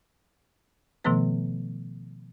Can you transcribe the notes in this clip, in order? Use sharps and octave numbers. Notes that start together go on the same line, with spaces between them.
B2 D#3 F3 A3 B3 B4